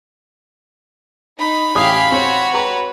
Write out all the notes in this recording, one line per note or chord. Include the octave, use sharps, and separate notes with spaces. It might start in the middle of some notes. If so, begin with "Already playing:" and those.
D#4 B5
A1 G4 F5 G#5 D#6
C4 F#4 C#5
B4 G5 A#5 C#6